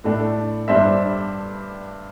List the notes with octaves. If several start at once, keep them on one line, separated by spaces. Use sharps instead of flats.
A2 A3 D4
G2 G3 D4 C5 E5